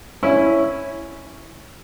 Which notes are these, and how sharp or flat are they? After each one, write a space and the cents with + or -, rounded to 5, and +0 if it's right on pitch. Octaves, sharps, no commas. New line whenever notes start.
C#4 +0 E4 +0